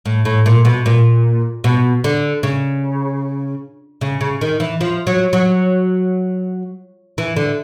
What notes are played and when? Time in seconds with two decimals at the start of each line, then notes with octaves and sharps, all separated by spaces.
0.06 A2
0.25 A2
0.46 A#2
0.65 B2
0.86 A#2
1.64 B2
2.04 D3
2.43 C#3
4.01 C#3
4.21 C#3
4.41 D#3
4.60 E3
4.81 F3
5.07 F#3
5.33 F#3
7.18 E3
7.37 D3